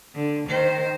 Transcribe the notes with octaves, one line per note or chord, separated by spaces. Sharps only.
D3
D#3 C5